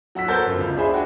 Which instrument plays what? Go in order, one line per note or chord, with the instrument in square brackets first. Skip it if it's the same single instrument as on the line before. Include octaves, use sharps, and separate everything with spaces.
[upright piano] F#3 F#5 E6 B6
B3 F#4 A4 A#4 C5 G6
G1 F#2
C#2
D4 G#4 C5 E5 G#5 B5
D4 F#4 G5